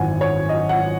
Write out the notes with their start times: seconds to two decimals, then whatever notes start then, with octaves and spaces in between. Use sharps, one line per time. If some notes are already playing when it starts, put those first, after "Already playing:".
Already playing: G#1 F#2 E3 F#5 G#5
0.21 C#5
0.49 D#5
0.69 F#5